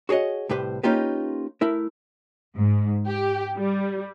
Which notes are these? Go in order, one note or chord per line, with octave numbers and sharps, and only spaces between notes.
F#4 G#4 C#5 D#5 F#5
C2 A2 G4 B4 C5
A#3 C#4 D#4 F4 G4 B4
A3 E4 A#4
G#2
G4
G3